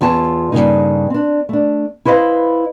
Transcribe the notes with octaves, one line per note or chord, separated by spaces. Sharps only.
E2 F4 C#5 A5
G2 A#2 C#3 A#3 D#4
C4 D4
A3 D4
E4 B4 C5 D#5 F5